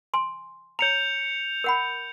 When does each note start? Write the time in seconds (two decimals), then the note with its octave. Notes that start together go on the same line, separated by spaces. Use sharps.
0.14 G#5 C6
0.79 C#5 A#5 G6 C#7 F7
1.64 A#4 F#5 B5